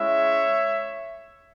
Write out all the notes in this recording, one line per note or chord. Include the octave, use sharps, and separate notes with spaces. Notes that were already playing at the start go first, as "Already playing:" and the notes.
Already playing: G#3 C#4 E4 C#5 E5